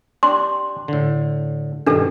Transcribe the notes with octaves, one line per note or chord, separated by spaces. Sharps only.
D4 G4 C6
A2 D3
G2 B2 D#3 D4 A4